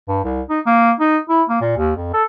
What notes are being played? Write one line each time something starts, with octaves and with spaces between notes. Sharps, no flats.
G2
C2
D#4
A#3
D#4
E4
A#3
A#2
D#2
F2
A4